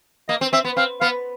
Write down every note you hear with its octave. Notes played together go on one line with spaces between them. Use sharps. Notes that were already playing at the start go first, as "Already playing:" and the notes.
A#3 D#5
C4
C4 E5
B3
C4 F5
B3 F5